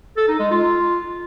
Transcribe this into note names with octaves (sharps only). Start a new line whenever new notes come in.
A4
D#4
G#3
F4